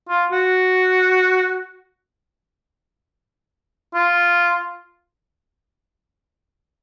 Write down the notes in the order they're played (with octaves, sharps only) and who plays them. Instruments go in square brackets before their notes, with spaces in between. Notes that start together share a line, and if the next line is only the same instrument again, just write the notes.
[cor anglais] F4
F#4
F4